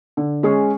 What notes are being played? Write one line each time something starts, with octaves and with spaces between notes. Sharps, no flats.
D3
G#3 C#4 G#4